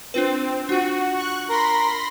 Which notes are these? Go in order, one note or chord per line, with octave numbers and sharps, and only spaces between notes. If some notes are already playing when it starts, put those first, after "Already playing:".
C4 D4 F4 B4
D4 F4 F#4
C#6 F#6
A#4 B5 C6 A#6